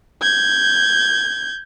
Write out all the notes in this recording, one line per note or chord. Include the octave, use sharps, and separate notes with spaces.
G6 G#6